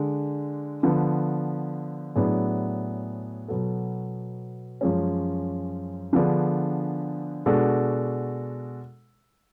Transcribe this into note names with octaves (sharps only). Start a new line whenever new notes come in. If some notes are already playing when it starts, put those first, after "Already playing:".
Already playing: D3 G#3 D4
D3 F3 B3
A2 F#3 B3 D4 G#4
B2 F#3 B3 F#4 A4
F#2 F3 G#3 C#4
D3 F3 B3 D4 G#4
B2 G#3 D4 F#4 A4